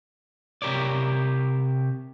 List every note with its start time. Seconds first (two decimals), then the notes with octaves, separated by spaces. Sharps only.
0.62 C3 G4 A#4 C#5 D5